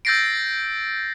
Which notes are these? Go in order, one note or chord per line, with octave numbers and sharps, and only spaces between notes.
E6 G6 A6 A#6 C7 D7